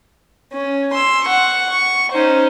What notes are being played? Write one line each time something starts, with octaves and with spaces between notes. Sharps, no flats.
C#4
C6 E6
F#5 C#6
C#6
C#4 D#4 C5